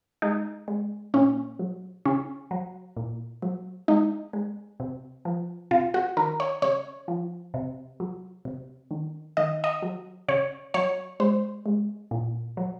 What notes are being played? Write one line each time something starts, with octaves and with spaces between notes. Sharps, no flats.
G#3 D#4
G#3
A#2 C#4
F#3
C#3 C#4
F#3
A#2
F#3
G#3 D#4
G#3
C3
F3
C3 F4
F#4
D#3 A#4
C#5
C#3 C#5
F3
C3
F#3
C3
D#3
D#3 D#5
D#5
F#3
C#3 C#5
F#3 C#5
G#3 C5
G#3
A#2
F#3